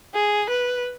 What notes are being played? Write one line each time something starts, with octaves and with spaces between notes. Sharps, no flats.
G#4
B4